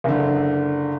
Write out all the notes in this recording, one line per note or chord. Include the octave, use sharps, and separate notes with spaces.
F#1 D3